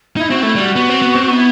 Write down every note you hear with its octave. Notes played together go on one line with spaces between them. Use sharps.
D#4 E4
C4 F#4
A3 E4
G3 F#4
B3
C4
B3
C4
B3 D#4
E4